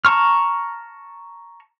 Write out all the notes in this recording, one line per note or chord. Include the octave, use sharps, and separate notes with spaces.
A5 A#5 C#6 F6